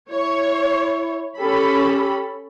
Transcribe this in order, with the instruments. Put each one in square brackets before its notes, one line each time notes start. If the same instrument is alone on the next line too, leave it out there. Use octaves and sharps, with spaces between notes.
[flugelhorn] E4 [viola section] C#5
[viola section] C#4 A4 B5 [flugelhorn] G4